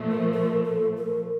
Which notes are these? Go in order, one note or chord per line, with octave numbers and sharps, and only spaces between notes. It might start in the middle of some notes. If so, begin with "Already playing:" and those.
Already playing: A#2 F3 A3
A#4
A#4
A4
A#4